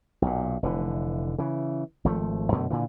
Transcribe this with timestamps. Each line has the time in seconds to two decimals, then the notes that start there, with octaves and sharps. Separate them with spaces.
0.22 B1 A#2
0.63 F1 D3 E3
1.38 C#3 E3
2.05 G#1 F3 A3
2.52 F#2 B2 D3 A3
2.70 A#2 D3 E3